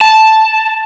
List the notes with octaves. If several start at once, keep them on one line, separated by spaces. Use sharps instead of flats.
A5